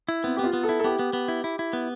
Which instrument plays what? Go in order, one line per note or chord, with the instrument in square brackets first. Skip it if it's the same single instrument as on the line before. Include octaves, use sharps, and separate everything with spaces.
[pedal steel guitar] E4
[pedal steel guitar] B3 [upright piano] C4
[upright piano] G4
[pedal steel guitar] B3 [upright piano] F4
[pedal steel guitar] B3
[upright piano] A4
[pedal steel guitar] E4
[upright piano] A4
[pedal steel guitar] B3 [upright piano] G4
[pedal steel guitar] B3
B3
E4
E4
E4
B3